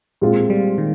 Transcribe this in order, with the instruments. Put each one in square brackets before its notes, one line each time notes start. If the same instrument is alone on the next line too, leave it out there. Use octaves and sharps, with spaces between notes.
[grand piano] A#2 G#3 C4 F4
[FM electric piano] G3
D#3